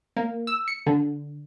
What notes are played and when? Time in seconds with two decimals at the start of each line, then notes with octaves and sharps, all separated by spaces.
0.17 A#3
0.47 E6
0.68 C#7
0.86 D3